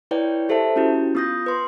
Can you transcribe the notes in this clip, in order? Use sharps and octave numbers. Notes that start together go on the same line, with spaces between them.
E4 B4 C#5 D5 G5
G4 A4 C5 E5 A5
C#4 E4 F#4 G4
B3 F4 D#6 G6 A#6
B4 C6